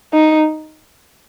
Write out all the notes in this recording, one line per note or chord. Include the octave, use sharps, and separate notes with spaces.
D#4